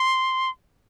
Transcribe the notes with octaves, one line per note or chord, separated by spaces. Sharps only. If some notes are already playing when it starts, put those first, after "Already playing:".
Already playing: C6